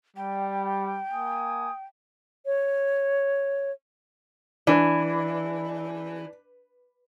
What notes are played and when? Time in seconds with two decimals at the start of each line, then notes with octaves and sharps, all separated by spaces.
0.16 G3 G5
1.12 A#3 G#5 D#6
2.46 C#5
4.67 E3 D4